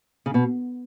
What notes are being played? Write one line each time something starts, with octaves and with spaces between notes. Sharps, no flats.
C#3
B2